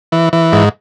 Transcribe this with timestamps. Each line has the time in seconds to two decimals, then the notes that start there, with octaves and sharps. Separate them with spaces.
0.12 E3
0.33 E3
0.53 G#2